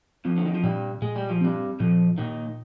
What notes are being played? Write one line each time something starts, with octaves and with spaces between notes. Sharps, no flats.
F2 F3 C4
D3
D#3
F3
G2 A#2 G3
A#2 G#3
G3
F3
G2 G3 C4
F2 A#2 F3
D#2 A#2 D#3